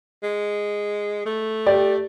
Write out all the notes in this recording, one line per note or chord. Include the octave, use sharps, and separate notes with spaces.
G#3
A3
G4 D5